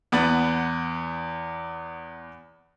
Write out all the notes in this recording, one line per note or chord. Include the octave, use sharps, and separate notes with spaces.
E2 B3 B4 A6 F#7